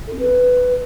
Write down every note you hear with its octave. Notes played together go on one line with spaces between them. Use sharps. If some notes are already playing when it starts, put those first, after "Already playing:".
A4
C4
B4